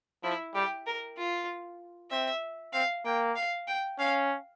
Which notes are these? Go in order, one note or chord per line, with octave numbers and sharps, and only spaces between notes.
F3 E4
G3 G4
A#4
F4
C4 E5
C4 F5
A#3 G5
F5
G5
C#4 F5